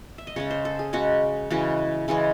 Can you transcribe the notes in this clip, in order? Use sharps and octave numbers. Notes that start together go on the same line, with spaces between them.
E5
D#5
C#3 G#3 C#4 C#5
C5
A4
G#4
C#3 G#3 C#4 F#4
C#3 E3 G#3 C#4 F#4
C#3 E3 G#3 C#4